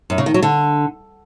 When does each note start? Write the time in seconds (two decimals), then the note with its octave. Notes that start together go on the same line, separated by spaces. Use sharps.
0.10 F#2
0.18 C#3
0.26 D#3
0.34 F#3
0.43 D3